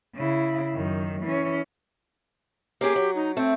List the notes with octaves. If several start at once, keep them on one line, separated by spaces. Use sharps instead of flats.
C#3 E4
F#2 D#3
E3 C#4
A#3 C#4 G4 G#4
F#3
D#4
A3 C4